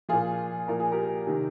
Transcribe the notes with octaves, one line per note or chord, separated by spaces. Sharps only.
A#2 F3 F4 G#4
A#2 F3 A#4
G#4
G4 A#4
C3 D#3